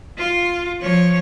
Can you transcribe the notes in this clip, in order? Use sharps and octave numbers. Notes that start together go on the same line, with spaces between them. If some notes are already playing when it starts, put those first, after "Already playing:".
F4
F3 C#5